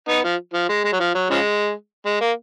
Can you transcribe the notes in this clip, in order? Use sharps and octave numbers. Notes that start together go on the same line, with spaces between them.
B3 D#4
F3
F3
G#3
G#3
F#3
F3
F#3
C#3 F3 G#3
G#3
A#3